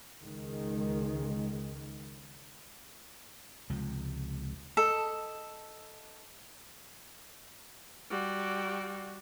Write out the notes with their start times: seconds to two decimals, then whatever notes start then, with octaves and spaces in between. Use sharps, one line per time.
0.21 C#2 D#3 G#3
3.70 C#2 C3 F3 G#3
4.77 A4 D#5
8.10 G3 F#4